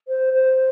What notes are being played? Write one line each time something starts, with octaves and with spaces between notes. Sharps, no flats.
C5
C5